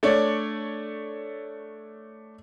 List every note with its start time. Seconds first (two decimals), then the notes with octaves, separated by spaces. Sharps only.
0.03 A3 D4 C#5 D5